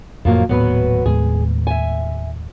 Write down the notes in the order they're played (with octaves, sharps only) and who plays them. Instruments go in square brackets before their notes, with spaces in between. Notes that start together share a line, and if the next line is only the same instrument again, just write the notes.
[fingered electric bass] F2 A2 [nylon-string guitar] F3 F#3 A#3
[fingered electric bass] D#1 A2 A#3 [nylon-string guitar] F#3 B3 B4
[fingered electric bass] D#2 A2 G#3 [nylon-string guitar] G#4
[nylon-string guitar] E5 G#5